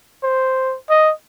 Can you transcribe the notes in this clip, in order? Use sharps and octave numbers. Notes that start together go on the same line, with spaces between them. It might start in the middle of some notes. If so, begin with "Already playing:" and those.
C5
D#5